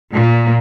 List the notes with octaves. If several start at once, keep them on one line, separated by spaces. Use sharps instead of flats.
A#2